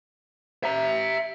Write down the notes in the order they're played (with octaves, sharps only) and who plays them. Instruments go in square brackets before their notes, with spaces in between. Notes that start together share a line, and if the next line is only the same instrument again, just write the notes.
[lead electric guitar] E5 A#5